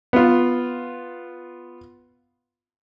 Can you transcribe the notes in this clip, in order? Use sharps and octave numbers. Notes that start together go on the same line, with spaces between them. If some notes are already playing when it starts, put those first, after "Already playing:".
B3 F4